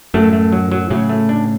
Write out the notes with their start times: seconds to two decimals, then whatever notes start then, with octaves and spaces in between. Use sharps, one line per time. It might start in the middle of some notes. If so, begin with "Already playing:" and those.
0.14 F#2 A2 A3
0.33 A3
0.52 F#3
0.72 F#3
0.90 A2 C#3 F#3
1.09 A3
1.29 D4